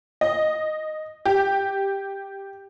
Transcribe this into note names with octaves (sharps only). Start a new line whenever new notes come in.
D#5
G4